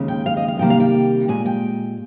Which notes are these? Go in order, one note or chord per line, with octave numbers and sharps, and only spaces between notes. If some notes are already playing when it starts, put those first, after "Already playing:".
Already playing: D#2 C#3 G#3
G5
F5
D#5
F5
C3 D#3 G3 A#3 G5
F5
G5
A#2 G#3 G#5
G5